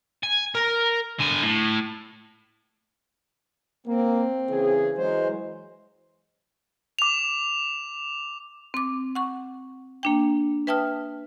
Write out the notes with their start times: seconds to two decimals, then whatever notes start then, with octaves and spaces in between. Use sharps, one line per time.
0.23 G#5
0.55 A#4
1.19 D3 G#5
1.43 A2
3.87 A#3 C4
4.50 C#3 E3 G#4
4.97 E3 F#3 G#3 C5
6.99 D6 F7
8.74 C4 D6
9.15 F#5 C#6
10.03 A#3 D4 G5
10.67 B4 E5 G5 A5 D#6 F6